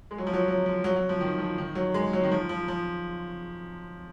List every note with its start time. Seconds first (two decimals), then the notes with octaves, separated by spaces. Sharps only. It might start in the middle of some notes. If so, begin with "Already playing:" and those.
0.11 G#3
0.18 F#3
0.27 F3
0.34 F#3
0.48 F#3
0.66 F3
0.84 F#3
0.96 F#3
1.09 F3
1.21 D#3
1.39 F3
1.58 D#3
1.75 F#3
1.94 G#3
2.13 F#3
2.24 D#3
2.32 F3
2.49 F3
2.68 F3